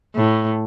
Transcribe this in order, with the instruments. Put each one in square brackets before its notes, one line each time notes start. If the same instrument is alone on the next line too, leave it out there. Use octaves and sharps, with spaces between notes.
[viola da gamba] A2